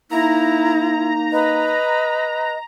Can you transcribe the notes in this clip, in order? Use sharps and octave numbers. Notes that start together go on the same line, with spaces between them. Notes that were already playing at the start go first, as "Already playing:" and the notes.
A#3 D#4 E4 A#5
B4 D#5